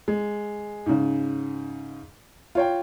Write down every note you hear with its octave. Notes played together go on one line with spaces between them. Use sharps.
G#3
G#2 C#3
F4 C#5 G5